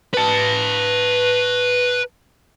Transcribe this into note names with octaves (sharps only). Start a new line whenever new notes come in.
B4 A5